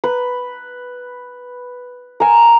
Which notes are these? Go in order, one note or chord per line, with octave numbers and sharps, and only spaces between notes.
B4
A#4 G#5